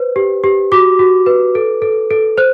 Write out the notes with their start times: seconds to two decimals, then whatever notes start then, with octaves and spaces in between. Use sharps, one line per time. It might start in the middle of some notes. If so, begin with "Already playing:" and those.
Already playing: B4 C5
0.16 G4
0.44 G4
0.72 F#4 D6
0.99 F#4
1.26 B4
1.55 A4
1.82 A4
2.11 A4
2.38 C5 F#6